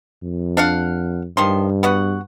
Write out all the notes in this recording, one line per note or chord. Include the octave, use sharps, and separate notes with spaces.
F2
D4 F5 F#5
G2 D#3 F3 C6
B3 F#4 F#5